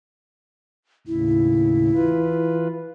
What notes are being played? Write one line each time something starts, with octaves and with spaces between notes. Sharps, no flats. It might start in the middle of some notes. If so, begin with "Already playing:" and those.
D#2 A2 C#3 E4
E3 F4 B4